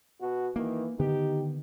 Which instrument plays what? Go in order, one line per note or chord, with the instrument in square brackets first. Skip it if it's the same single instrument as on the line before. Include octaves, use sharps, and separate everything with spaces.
[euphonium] B2 [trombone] F#4
[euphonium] D#3 [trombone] E3 [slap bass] A#3
[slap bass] D3 D#3 B3 [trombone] D#4 [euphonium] G4